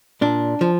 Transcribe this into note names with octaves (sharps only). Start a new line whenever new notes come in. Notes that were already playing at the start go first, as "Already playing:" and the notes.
A#2 D4
F3